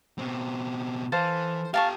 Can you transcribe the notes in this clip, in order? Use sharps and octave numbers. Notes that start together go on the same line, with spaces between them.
B2 C4
E3 A4 C5 F5
G4 A4 F5 A5 C#6